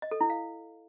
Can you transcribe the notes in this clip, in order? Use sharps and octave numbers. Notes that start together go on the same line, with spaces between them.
D#5
A4
E4
F5